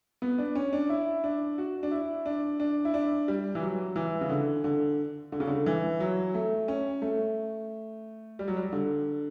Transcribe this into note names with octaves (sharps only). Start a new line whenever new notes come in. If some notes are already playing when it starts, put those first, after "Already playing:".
B3
D4
C#4
D4
E4
D4
F#4
D4
E4
D4
D4
E4
D4
G3
E3
F#3
E3
C#3
D3
D3
D3
C#3
D3
E3
F#3
A3
C#4
A3
G3
F#3
G3
D3